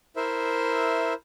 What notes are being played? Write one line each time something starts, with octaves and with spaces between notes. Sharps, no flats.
E4 A#4 C5 E5